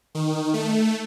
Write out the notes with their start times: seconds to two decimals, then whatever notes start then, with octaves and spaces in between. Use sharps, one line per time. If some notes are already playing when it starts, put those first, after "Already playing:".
0.15 D#3
0.54 A3